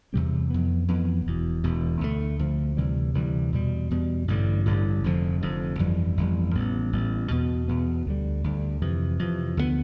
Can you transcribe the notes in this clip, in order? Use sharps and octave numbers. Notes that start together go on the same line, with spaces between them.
E2 C3 G3 C4
F2 E3 B3
F2 E3 B3
E1 E2 B2
E1 E2 B2
D2 D3 F3 A3
D2 D3 F3 A3
D2 C3 E3 G3
D2 C3 E3 G3
E2 B2 G3
E2 B2 G3
A1 G2 D3 G3
A1 G2 D3 G3
F1 F2 D3 F3
F1 F2 D3 F3
G1 F2 E3 G3
G1 F2 E3 G3
A1 A2 G3 B3
A1 A2 G3 B3
E2 B2 B3
E2 B2 B3
D2 D3 G3
D2 D3 G3
F2 C3 E3
F2 C3 E3
D2 D3 F3 B3